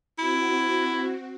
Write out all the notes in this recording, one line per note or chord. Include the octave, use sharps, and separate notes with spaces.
C4 E4 F#4